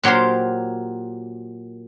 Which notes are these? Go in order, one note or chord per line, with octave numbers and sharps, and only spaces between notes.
A#2 F#3 G4 A#4 C5